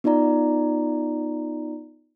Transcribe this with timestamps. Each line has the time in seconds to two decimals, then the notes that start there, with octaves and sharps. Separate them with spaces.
0.04 B3 D#4 F4 D5 A#5